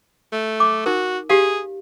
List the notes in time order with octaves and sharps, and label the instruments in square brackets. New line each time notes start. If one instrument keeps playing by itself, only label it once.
[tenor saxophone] A3
[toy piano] D6
[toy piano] D#4 A#4 [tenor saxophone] F#4
[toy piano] G4 F5 [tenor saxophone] G#4